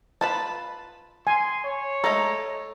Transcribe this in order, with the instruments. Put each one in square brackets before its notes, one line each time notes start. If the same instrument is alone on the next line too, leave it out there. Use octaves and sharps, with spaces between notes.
[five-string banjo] F4 B4 B5 [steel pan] A5
[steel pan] G#5 [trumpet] C6
[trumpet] C#5
[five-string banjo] G#3 A3 A4 [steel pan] A#5